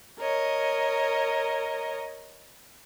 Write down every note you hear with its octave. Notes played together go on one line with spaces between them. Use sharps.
A#4 C#5 D#5